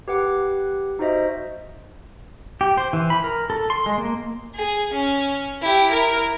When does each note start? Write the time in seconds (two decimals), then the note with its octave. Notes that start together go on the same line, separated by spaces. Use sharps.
0.08 G4 B4 F#5 D6
0.99 D#4 F#4 C5 D#5 E5
2.61 G4
2.77 C5
2.93 E3
3.10 B5
3.24 A#4
3.50 A4
3.70 C6
3.86 G#3
3.98 A#3
4.55 G#4
4.94 C#4
5.62 E4 G4
5.91 E4 A#4